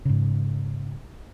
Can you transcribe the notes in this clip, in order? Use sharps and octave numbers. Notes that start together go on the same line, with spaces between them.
G#2 C#3